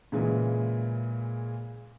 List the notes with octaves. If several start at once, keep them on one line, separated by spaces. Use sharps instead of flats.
A#2 C#3 E3 G#3